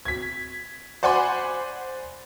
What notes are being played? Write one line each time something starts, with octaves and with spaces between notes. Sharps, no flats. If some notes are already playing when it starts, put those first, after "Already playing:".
G#6 B6
C5 D5 F#5 G#5 B5 C6